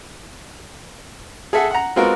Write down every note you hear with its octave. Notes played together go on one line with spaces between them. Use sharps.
G#4 A4 E5 F#5
F#5 A#5
G#3 B3 C4 F4 F#4 A#4